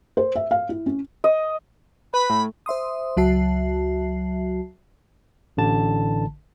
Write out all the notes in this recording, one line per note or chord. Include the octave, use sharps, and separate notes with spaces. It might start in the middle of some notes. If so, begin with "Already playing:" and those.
C5
E5
F5
E4
C#4
D#5
B4 B5
A2
C5 E5 C6 D#6
C#2 F#3 F#4 E5 A5 C7
A1 D3 A5